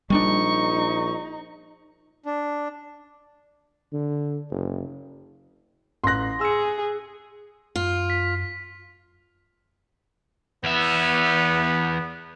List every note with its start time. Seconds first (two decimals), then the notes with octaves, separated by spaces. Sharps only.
0.10 A#1 G3 A#3 D4 D#4 C#6
2.26 D4
3.93 D3
4.51 F#1
6.04 A1 C6 F#6 A#6
6.41 G#4 E6 C#7
7.76 F#2 F4
8.10 B6
10.64 E2 B3 E5